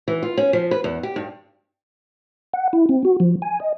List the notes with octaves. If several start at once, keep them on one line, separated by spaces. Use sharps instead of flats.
E3
F4
C#4
F3
B4
E2
G4
G2
F#5
E4
C4
F#4
F3
G#5
D#5